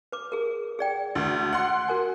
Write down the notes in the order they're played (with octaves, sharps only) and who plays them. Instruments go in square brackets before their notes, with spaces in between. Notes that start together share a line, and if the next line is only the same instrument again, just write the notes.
[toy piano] B4 D6
G#4 A#4
G#4 D5 G5
[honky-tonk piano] D2
F#5 C6
[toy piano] F#4 A#4 G#5